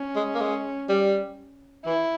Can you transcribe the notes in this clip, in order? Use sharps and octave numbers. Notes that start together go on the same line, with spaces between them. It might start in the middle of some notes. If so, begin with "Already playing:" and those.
Already playing: C#4
G#3
A#3
G#3
G3
E3 E4